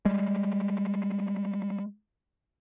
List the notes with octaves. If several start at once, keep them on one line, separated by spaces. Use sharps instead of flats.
G3 G#3